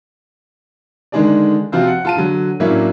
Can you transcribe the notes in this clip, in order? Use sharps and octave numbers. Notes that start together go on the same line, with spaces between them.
D3 D#3 G#3 D4 G#4 D5
C3 F3 C4 F4 F#4
F#5
F4 A5 D#7
D3 F#3
A2 F#3 A#3 C#4 D4 E4